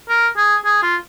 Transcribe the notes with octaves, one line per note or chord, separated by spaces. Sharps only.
A#4
G#4
G#4
F4